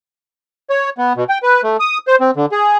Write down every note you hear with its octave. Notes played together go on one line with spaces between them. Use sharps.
C#5
B3
B2
G5
B4
A3
D#6
C5
C4
D3
G#4